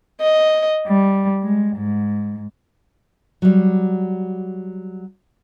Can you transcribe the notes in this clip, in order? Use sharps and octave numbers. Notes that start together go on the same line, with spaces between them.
D#5
G3
G#3
G#2
F#3 G3